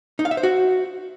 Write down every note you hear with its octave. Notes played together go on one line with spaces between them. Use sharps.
D#4
F5
E5
C5
F#4